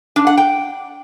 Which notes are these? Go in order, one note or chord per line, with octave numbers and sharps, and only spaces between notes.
D4
F#5
G5